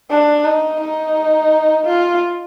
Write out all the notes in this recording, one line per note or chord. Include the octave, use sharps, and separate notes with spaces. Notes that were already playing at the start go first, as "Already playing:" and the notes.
D4
D#4
D#4
F4